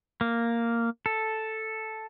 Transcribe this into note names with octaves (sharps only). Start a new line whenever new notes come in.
A#3
A4